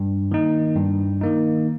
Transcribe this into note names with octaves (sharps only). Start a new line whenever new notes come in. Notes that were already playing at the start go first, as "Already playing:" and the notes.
Already playing: G2
D#3 A#3 D#4
G2
D#3 A#3 D#4